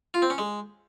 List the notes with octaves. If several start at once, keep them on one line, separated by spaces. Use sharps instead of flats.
F4
C4
C#4
G#3